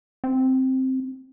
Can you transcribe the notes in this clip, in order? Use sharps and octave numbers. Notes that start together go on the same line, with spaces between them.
C4